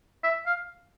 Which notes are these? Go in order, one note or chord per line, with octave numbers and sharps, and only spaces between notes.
E5
F5